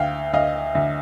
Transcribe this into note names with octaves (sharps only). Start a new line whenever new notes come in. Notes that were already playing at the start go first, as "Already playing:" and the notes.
Already playing: D2 F5 G5
D2 D#5 F5
D2